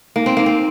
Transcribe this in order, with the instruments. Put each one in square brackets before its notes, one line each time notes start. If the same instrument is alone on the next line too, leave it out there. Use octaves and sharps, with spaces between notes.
[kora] A#3 [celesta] D#4
[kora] C4
[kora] A#3 [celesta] D#4
[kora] C4